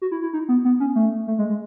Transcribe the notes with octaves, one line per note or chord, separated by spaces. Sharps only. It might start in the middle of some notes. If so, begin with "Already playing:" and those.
F#4
E4
E4
D#4
B3
B3
C#4
A3
A3
G#3
G#3